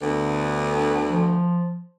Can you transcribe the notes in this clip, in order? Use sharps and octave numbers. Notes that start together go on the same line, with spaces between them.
D2 D3 B3
F3